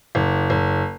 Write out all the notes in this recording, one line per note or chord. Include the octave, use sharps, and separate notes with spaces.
F#1
F#1